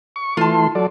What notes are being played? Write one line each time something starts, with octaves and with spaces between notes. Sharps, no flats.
C#6
E3 A3 F4 A5 C6
F#3 A4 D5